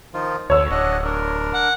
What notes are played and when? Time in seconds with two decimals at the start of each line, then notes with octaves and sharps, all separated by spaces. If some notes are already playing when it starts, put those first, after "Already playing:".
0.14 D#3 F3 F4
0.50 D2 D3 C#5 E6
0.71 D1 D4 D#5 F#5
1.04 D4 A#4
1.54 F#5